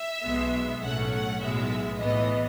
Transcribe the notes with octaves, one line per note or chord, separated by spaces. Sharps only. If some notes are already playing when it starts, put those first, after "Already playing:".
Already playing: E5
B1 B2 G#3 B3
B1 A2 F#3 A3 C#4 F#5
F#5
B1 A2 G#3 B3 E5
A2 E3 B3 D#5